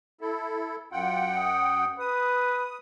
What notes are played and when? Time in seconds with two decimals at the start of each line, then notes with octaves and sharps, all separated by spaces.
0.21 E4 A4
0.92 F#2 F4 F#5 G5
1.38 D#6
2.00 B4 D#6